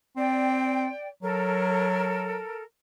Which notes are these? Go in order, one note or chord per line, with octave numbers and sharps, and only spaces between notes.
C4 D5 G5
F#3 A4 A#4